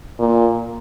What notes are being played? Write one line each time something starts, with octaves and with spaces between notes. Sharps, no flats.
A#2